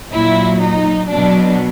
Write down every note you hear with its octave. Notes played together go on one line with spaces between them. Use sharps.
A#2 F#3 E4
D#4
B2 F#3 D4